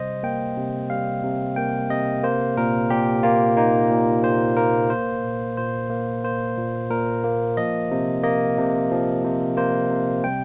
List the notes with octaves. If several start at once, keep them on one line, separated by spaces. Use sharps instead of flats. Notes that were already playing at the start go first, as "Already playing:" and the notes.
Already playing: C3 G3 C5 D#5
A#3 G5
C3
G3 F5
C3
A#3 G5
C3 D#5
A#3 C5
A#2 A#4
A#2 G4
A#3 F4
A#3 D#4
A#2
A#2 C5
A#3 A#4
A#3 C5
A#2
A#2 C5
A#3
A#3 C5
A#2
A#2 A#4
A#3
F3 D#5
C3
A#3 D#5
C3
F3
C3
A#3 C5
C3
G3 G5